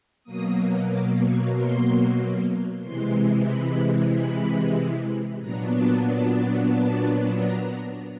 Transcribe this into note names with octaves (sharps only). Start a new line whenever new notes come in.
B2 F#3 A#3 D#6
D6
C#6
C6
C3 E3 G#3 C6
B5
B5
A#2 F#3 B3 D4 A#5
A5
A5
A5
A#5